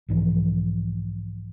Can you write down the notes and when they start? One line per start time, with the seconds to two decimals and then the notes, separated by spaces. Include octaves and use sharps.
0.09 B1 G#2 E3 F3